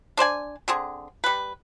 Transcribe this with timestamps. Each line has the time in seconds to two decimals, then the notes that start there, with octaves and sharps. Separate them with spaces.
0.17 D4 C5 D5 G#5
0.68 D3 C4 G#4
1.24 G3 B4